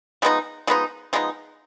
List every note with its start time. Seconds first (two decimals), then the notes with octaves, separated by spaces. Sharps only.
0.22 F3 G#3 B3 D#4
0.67 F3 G#3 B3 D#4
1.13 F3 G#3 B3 D#4